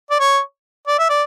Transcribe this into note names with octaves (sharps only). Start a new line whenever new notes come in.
D5
C#5
D5
E5
D5